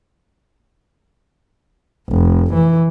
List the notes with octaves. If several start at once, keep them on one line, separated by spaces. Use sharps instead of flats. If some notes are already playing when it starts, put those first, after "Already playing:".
F1
E3